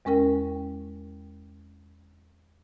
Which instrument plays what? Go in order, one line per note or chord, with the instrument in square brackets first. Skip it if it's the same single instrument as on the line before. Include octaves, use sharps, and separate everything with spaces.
[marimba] E2 G#3 C#4 A#4 G5